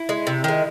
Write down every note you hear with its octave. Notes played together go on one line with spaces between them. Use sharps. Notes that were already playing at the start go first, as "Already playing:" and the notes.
Already playing: E4
G#3
C3
D#3 G#3